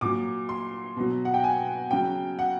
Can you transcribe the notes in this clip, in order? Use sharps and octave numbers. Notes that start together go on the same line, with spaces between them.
A#2 F#3 D6
C6
B2 F#3
F#5
G5
G#5
C#3 F#3 G5
F#5